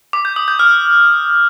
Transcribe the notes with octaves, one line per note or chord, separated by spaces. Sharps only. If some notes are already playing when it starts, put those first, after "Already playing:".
D6
G6
D#6
G6
F6